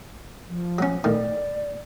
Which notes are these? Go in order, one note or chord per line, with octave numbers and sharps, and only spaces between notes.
F3
F#3 C#4
A2 D#3 D5